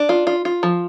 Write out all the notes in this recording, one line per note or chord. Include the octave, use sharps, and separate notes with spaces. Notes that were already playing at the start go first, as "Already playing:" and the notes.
Already playing: D4
F4
F4
F4
F3